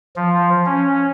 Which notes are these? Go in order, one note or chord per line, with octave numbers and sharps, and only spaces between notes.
F3
C#4